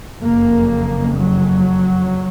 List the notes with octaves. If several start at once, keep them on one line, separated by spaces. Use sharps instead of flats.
F#1 F2 A#3
F#3